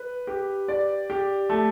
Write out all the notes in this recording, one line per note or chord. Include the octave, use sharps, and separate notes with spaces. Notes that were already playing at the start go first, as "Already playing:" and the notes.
Already playing: B4
G4
D5
G4
A3